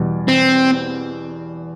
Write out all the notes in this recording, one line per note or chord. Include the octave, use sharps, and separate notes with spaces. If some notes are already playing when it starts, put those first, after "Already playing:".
Already playing: E2 B2 G3
C4